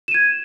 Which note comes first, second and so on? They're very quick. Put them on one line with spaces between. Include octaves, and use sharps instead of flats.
E7 D#7 G#6